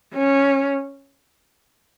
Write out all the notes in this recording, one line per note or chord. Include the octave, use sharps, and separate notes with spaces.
C#4